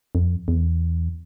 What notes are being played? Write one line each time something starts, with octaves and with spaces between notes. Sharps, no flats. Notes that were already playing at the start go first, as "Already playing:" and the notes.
F2
E2